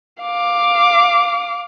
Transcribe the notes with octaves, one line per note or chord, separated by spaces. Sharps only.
F5 D6